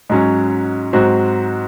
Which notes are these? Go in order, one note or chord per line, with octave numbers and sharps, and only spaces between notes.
G#2 F#3 C#4
G#2 F#3 C4 F#4